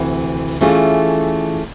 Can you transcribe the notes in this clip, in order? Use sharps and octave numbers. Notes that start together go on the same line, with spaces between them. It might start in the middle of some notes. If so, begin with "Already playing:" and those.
Already playing: D2 C3 E3
E3 A3 C#4 F4 G#4